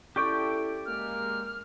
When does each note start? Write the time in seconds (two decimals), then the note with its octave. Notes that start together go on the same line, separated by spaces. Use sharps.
0.16 C#4 E4 G4 A4 D5 G5 C#6
0.86 G#3 A#3 F6